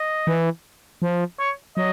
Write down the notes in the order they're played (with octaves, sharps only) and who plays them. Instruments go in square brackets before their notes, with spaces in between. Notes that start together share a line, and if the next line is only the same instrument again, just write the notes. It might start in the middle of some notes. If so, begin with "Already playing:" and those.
Already playing: [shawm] D#5
[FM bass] E3
F3
[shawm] C#5
[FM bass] F#3 [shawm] D#5